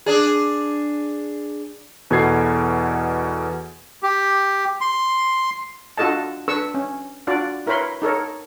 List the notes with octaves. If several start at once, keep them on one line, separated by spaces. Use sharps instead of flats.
D4 G#4
E2 B2 A4 B4 G#6 C7
G4
C6
D4 F4 F#4 A4 D#5 A5
D4 A4 B4 C#6 E6
C#4
D4 F4 F#4 D5
E4 A#4 B4 C#5 B5 C6
D#4 A4 A#4 C#5